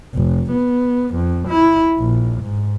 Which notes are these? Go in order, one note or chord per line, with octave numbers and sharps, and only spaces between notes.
F1
B3
F2
E4
A#1
G#2